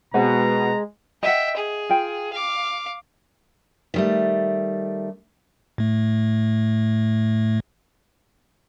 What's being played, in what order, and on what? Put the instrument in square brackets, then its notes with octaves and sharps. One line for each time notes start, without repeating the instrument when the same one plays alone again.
[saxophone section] B2 [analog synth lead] G#3 [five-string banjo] C4 B4 F#5 [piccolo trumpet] A#5
[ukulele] D#5 F#5 [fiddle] E5 G5
[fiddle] G#4
[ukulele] F4 G5
[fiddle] F5 D6
[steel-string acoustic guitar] D#3 G3 A3
[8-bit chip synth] A2 A3